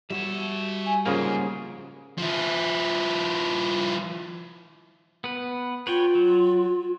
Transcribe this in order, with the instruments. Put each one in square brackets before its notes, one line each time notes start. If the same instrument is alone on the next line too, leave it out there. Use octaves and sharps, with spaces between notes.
[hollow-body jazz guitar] G3 F#4 [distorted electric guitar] C#5 E5
[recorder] G#5
[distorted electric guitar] G#2 [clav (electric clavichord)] C#3 F3 A#3 [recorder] G#4
[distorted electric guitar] F3 E4
[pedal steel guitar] B3 B4
[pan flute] F4 [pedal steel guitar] B4 C#5 G5
[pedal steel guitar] F#3